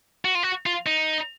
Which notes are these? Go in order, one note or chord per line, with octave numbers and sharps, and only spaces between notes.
F#4
F4
F#4
F4
D#4